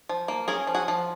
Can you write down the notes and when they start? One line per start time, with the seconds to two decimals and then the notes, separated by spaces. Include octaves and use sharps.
0.09 F3
0.28 A#3
0.48 C#4 G#4 A#4
0.67 F3
0.75 F#4 G#4
0.88 F3